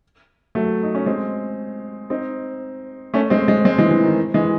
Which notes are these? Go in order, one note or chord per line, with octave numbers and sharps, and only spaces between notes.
F#3 A3
D#4
C#4
G#3 C4
C4 D#4
A3 C#4
G#3 C4
G#3 C4
G#3 C4
E3 G#3
E3
D#3
E3 G#3